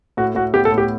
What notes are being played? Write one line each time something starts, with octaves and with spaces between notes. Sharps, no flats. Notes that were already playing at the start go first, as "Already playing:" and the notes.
A2 F#4
A2 F#4
B3 G4
A4
A2
G4